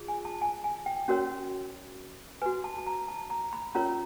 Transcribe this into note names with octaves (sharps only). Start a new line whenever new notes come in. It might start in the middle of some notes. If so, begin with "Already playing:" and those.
Already playing: F4 G#4
G#5
A5
G#5
G#5
G5
C#4 F#4 A#4 C#5
F#4 B4 G#5
A5
A5
A#5
A5
A#5
B5
C#4 F4 A#4 C#5 A#5